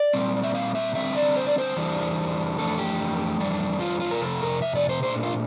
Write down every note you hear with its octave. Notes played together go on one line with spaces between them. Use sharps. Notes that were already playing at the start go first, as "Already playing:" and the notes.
Already playing: D5
A#2 G3 C4
E5
F5
E5
D3 G3 C4 E5
D5
C5
D5
C5
E2 E3 G3 D4
F2 E3 A3 D4 A4
G4
F2 E3 G3 D4
F4
F4
A#4
F2 C3 A4
A#4
E5
D5
C5
A#2 A3 D4 C5
F4